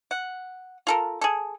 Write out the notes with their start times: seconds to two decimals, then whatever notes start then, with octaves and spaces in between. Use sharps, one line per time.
0.11 F#5
0.87 F4 A4 A#4
1.21 G#4 A4